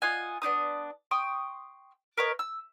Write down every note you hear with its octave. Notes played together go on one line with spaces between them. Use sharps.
F4 D#5 F#5 G#5
B3 D4 D#4 D#6
G5 C6 C#6 D#6
A#4 B4 C#5 D#5
E6